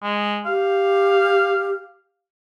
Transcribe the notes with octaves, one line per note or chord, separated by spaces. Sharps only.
G#3
G4 F5